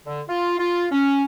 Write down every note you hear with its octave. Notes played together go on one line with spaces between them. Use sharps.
D3
F4
F4
C#4